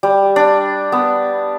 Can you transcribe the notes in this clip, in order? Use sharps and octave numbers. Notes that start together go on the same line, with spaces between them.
G3
D4
B3